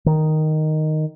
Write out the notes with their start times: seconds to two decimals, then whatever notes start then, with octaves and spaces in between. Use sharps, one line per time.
0.06 D#3